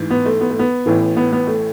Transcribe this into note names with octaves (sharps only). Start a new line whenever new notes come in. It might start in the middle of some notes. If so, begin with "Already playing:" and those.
Already playing: A1 G#2 E3
B3
A3
B3
A3
B3
A1 A2 E3
B3
B3
A3